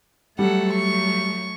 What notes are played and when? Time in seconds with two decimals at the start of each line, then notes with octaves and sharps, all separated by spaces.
0.39 F#3 G3 A3 A4 F#5
0.73 C#6